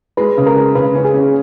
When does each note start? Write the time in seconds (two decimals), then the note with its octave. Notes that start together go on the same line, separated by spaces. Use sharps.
0.17 G#3 B4
0.37 C#3
0.46 A#4
0.56 G#3
0.75 C#3 B4
0.95 C#4
1.05 G#4
1.14 C#4